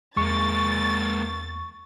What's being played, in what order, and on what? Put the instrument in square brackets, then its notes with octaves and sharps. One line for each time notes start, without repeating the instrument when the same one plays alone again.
[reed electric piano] E2 [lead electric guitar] G#3 A#3 [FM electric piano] C#6 [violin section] A6